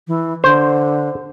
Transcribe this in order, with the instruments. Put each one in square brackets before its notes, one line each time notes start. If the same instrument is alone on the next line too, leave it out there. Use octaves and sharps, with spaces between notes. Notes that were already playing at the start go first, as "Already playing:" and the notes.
[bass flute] E3
[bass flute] D3 [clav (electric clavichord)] C5